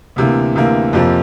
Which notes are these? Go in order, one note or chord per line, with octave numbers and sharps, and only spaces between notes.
D2 C3 E3 A#3
D2 C3 E3 A#3
F2 C3 F3 A#3